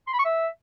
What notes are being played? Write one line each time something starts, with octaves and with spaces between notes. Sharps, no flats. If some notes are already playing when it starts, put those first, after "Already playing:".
C6
B5
C#6
E5